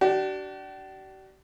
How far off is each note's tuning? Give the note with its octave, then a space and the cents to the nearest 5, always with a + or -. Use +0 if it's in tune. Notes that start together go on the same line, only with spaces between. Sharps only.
D4 +0 G4 -45